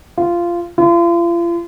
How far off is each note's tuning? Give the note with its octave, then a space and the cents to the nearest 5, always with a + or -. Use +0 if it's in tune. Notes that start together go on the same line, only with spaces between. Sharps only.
F4 -15
F4 -40